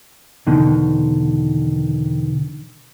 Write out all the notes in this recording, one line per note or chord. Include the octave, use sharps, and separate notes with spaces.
E2 B2 D3 D#3